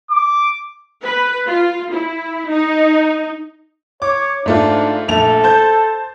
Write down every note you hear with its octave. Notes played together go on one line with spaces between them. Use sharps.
D6
B4
F4
E4
D#4
C#5 D6
G#2 A3 D4 F4
A#1 A3 A4 F7
C5 A5 G6